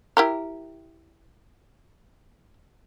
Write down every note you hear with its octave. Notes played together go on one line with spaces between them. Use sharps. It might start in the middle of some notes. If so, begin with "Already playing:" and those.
E4 G4 A#4